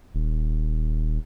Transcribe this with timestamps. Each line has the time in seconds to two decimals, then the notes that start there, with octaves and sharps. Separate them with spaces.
0.15 D#1